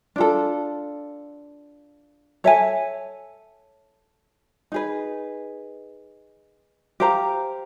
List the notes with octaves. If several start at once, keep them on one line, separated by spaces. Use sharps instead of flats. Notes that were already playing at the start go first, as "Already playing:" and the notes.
D4 F4 A4
A4 C#5 E5 G#5
D#4 G#4 B4
G4 C5 F5 A#5